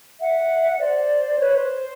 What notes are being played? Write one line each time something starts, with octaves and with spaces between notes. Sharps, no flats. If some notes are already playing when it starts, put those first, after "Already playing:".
E5 F#5
C5 D5
B4 C#5
C5